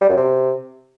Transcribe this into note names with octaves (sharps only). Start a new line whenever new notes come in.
G3
F#2
C3